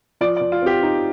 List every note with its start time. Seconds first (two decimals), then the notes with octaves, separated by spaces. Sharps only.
0.21 F3 D5
0.37 D5
0.41 F3
0.52 F4
0.62 C4 G4
0.83 D#4